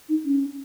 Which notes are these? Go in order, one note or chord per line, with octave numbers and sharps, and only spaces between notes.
D#4
C#4